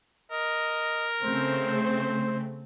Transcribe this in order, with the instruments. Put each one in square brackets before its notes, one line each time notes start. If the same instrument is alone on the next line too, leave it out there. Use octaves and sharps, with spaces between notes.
[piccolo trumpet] A#4 [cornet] D#5
[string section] C#3 A3 C4 [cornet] C5